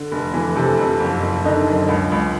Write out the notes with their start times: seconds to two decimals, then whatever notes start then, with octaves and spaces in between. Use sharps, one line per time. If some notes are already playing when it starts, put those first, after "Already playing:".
Already playing: D3
0.12 F1
0.34 E3
0.56 C3 A4
0.79 F2
1.00 F#1
1.22 F#1
1.44 D3 D#4
1.67 F#2
1.88 C#2
2.12 C#2